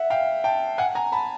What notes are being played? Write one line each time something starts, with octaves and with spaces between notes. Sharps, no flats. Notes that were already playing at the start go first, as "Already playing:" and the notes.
Already playing: E5 F#5
F5 G5
G5 A5
F#5 G#5
G#5 A#5
A5 B5